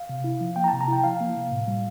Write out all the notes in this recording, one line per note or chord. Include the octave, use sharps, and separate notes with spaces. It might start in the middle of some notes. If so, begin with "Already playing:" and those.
Already playing: F5
C3
E4
F3
A#3 G5
A#5
C3 A5
A#5
E4 G5
F3 F5
A#3
C3
A2
G3